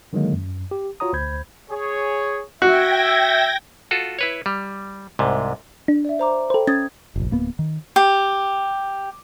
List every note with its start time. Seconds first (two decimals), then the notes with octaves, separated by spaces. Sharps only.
0.13 D3 D#3 F#3 G#3 A#3
0.33 F#2
0.71 G4
1.00 F4 F#4 C#5 A#5 D#6
1.13 D2 C5 B5 G6 G#6
1.70 G#4 C#5
2.62 F#4 E5 G5 G#6 A#6
3.91 F4 F#4 A4
4.19 E4 B4 C#5
4.46 G3
5.19 C2 G#2 C3
5.88 D4
6.05 D5 E5
6.19 C5 A#5 D6
6.50 A4 C5 G5 B5
6.67 C#4 D#6 G#6 A6
7.16 F1 A#1
7.31 D1 A#3 B3
7.59 D#3
7.96 G4